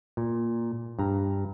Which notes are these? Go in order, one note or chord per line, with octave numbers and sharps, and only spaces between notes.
A#2
G2 A#5